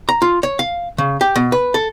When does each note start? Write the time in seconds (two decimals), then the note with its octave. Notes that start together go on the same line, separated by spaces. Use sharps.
0.09 A#5
0.22 F4
0.43 C#5
0.59 F5
0.98 C#3
1.21 G4
1.36 B2
1.52 B4
1.74 A4